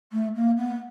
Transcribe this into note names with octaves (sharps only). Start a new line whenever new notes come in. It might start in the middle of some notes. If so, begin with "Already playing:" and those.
A3
A#3
B3